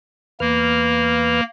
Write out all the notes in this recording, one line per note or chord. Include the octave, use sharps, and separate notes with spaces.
E2 A#3 B4 F6